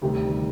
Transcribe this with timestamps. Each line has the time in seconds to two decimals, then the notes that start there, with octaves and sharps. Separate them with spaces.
0.02 D2 C3 D#3 G3